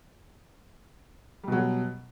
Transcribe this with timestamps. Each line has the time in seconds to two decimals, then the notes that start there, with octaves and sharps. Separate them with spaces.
1.43 G3
1.48 B2
1.52 F#3